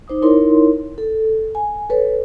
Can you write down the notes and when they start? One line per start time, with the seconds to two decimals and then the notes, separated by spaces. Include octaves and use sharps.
0.08 D#4 C5 D6 D#6
0.22 D#4 E4 A#4 C#5 C6
0.98 A4
1.55 G#5
1.89 A4 B4 C#5